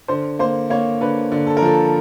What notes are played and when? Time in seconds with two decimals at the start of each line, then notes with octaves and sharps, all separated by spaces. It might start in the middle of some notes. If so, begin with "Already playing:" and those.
0.08 D3 C5
0.39 A#3 C5
0.70 A#3 C#5
1.01 D3 B4
1.32 D3
1.47 A4
1.57 A#4
1.62 F3 A4